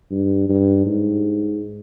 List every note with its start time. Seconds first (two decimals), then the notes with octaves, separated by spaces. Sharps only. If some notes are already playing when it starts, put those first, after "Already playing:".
0.11 G2
0.49 G2
0.86 G#2